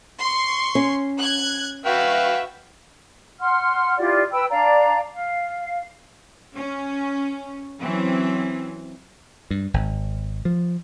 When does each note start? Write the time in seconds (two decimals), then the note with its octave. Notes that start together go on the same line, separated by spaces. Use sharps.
0.20 C6 C#6
0.75 C#4
1.18 F#6 G#6
1.86 F#4 B4 E5 F5 G5
3.40 F#5 C6 F6
3.98 E4 F4 G4 D5
4.32 B4 G5 B5 E6
4.50 D4 D5 F5 A#5
5.13 F5
6.55 C#4
7.80 E3 F#3 C4 C#4
9.51 G2
9.74 G#1
10.45 F3